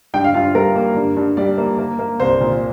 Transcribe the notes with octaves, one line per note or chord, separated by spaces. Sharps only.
G2 G5
F5
G2 F4
G3 A#4
A#3
G2
G2
G3 D5
A#3
A#3
A#3
C2 C5
A#2